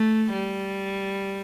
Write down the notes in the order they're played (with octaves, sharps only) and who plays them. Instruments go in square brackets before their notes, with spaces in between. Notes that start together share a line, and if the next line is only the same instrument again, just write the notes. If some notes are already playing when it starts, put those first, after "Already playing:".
Already playing: [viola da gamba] A3
G3